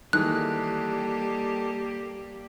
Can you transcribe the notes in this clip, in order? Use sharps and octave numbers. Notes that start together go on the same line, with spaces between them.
D#3 E3 G3 G#3 A#3 G4 A4 F#6